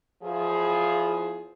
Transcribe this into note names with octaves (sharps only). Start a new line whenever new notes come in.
E2 F3 G#4